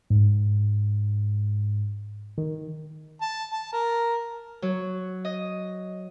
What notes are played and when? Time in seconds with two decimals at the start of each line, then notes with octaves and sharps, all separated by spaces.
0.10 G#2
2.38 D#3
3.21 A5
3.51 A5
3.73 A#4
4.62 F#3
5.25 D#5